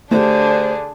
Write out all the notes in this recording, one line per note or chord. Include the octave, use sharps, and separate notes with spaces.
D3 A3 D4 G4 G#4 C5